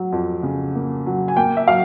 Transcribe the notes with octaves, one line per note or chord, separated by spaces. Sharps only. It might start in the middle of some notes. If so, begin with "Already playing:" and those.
Already playing: F#3
F2
C#3
A#3
F#3
G#5
A#3 G5
E5
F#3 F5